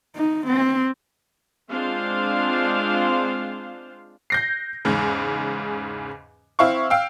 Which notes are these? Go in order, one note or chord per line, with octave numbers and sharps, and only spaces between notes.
D#4
C4
G#3 C4 D4 F4 C5 F5
G6 A#6 C7
E2 G#2 C#3
C4 E4 F5 C#6
F5 G5 E6